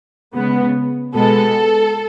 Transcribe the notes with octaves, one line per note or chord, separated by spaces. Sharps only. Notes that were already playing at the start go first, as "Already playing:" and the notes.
C#3 G#3 B3
B2 G#3 B3 A4